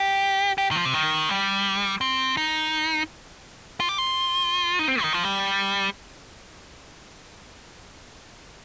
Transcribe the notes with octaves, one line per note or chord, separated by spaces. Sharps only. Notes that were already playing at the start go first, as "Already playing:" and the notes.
Already playing: G4
G4
D#3
F3
C3
D#3
G3
C4
D#4
F4
G4
F4
D#4
C4
D#3
F3
G3